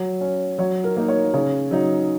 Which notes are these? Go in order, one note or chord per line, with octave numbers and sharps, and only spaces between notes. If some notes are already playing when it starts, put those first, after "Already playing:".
Already playing: F#3
C#4
F#3 C#5
A#4
A#3 D#4
C#5
C#3 C#5
F#3 D#4